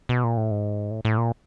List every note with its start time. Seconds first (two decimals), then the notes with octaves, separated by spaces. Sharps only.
0.09 B2
0.24 A#2
0.37 A2
0.51 G#2
0.91 A2
1.05 A2
1.18 A#2